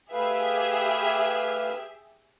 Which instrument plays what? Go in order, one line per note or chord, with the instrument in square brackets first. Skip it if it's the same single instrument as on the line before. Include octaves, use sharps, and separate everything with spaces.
[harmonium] A3 B4 F5 [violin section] G4 G#4 E5